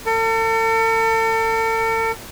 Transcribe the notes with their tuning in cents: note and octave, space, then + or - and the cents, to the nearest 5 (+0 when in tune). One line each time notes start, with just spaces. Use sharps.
A4 +40